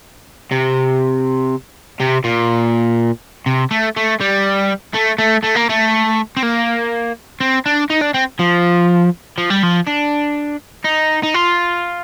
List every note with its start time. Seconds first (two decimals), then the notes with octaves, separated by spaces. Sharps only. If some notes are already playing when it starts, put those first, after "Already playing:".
0.52 C3
2.00 C3
2.24 A#2
3.46 C3
3.71 A3
3.96 A3
4.21 G3
4.94 A3
5.18 A3
5.44 A3
5.56 A#3
5.70 A3
6.37 C4
6.43 A#3
7.40 C4
7.66 D4
7.90 D#4
8.02 D4
8.14 C4
8.39 F3
9.38 F3
9.50 G3
9.63 F3
9.87 D4
10.85 D#4
11.23 D#4
11.34 F4